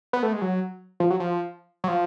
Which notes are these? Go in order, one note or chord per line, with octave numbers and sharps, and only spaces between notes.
B3
A3
G#3
F#3
F3
F#3
F3
F#3
F3